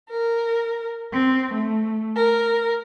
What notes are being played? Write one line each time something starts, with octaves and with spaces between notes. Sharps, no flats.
A#4
C4
A3
A#4